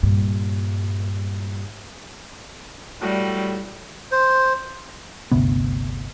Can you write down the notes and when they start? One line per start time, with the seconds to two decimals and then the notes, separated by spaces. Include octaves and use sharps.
0.03 G2 A#2
3.01 A2 G3 F#4
4.12 C5
5.32 G1 D2 C3 B3